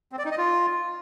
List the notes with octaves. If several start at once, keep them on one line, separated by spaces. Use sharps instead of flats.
C4
D5
D#4
D#5
F4